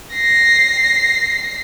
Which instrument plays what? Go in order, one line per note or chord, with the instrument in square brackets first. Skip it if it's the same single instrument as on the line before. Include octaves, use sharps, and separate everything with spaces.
[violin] A#6 C7